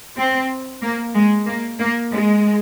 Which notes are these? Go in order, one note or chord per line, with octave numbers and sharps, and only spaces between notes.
C4
A#3
G#3
A#3
A#3
G#3